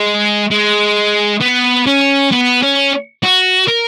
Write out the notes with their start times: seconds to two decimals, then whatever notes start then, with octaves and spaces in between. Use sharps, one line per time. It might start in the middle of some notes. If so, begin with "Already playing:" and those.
Already playing: G#3
0.51 G#3
1.41 B3
1.87 C#4
2.32 B3
2.63 C#4
3.23 F#4
3.68 A#4